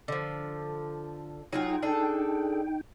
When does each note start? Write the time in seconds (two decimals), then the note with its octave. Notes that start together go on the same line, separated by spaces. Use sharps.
0.08 D3 F3
1.53 F#3 D#4 F4 G#4 G5
1.82 D4 G#4 A4